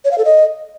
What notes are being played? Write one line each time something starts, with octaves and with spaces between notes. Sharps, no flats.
C#5
F5
A4
D#5